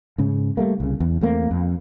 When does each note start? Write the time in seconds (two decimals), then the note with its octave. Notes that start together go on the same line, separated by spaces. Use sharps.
0.18 G#2 C#3
0.57 G3 A3 A#3
0.80 C2 C#3
1.00 E2
1.21 E2 A3 A#3 C4
1.51 F2